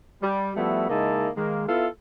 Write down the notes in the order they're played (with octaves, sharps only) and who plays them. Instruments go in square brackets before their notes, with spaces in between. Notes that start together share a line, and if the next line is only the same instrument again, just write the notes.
[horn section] G3
F3 G3 A3 B3 E4 F#4
C#3 G#3 A#3 D#4 E4 A5
D#3 G#3 A#3
B3 E4 F4 A4 E5 F5